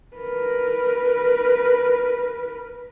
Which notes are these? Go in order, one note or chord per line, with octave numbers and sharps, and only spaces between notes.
A#4 B4